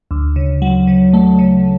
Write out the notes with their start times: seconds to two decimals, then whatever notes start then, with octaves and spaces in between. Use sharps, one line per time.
0.11 D2
0.36 C#3
0.62 F#3
0.87 C#3
1.13 A3
1.39 C#3